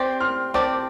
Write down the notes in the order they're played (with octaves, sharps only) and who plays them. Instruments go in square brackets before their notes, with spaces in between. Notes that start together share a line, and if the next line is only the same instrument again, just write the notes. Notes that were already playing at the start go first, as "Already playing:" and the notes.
Already playing: [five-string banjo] C4 G4 D5 [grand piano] G5 C6
[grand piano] C6 F6
[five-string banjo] C4 G4 D5 [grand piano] A5 D6